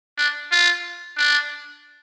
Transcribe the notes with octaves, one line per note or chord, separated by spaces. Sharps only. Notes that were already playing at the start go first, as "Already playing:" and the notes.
D4
F4
D4